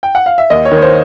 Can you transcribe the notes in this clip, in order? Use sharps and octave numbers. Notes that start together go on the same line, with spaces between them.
G5
F#5
F5
E5
D#2 D#5
C#5
D#3
C#5
C5